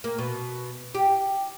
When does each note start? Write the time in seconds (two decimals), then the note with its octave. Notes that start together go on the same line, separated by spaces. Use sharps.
0.04 A#3
0.18 B2
0.95 G4